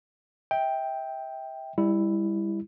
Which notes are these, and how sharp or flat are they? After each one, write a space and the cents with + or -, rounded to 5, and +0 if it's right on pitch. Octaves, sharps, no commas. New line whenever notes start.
E5 -35 G5 +5
G3 +25 E4 +0